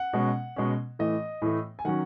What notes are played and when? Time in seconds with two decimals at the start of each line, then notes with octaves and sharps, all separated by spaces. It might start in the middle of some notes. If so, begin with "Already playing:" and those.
Already playing: F#5
0.13 B2 G#3 C#4
0.56 B2 G#3 C#4
0.99 A2 E3 A3 D#5
1.42 A2 E3 A3
1.79 G#5
1.85 D#3 F#3 C#4 F#5